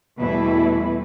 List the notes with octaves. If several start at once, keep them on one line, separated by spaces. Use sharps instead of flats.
E2 B2 G3 A3 E4 B4